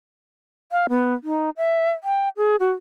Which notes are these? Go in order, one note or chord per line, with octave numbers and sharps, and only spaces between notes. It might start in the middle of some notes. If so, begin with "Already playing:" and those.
F5
B3
D#4
E5
G5
G#4
F#4